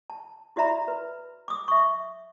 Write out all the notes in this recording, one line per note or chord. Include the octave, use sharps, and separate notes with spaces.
A5
E4 F#4 D5 E5 A#5 B5
B4
D6 D#6
E5 C#6